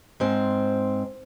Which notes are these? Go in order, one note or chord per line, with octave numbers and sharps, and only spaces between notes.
G#2 C4